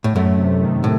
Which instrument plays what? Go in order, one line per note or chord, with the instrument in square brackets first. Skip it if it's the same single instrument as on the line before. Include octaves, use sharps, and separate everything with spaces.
[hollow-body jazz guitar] A2
[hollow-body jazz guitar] F#2 [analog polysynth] A3
[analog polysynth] C3
D#3
[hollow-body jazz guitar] A2